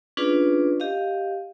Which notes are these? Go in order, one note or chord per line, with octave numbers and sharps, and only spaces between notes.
C#4 D4 F4 G#4 B4 D5
G4 D#5 F5